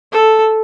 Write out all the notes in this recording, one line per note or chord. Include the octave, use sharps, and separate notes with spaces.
A4